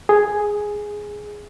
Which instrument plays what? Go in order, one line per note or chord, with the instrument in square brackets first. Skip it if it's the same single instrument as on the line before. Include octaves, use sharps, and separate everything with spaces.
[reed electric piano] G#4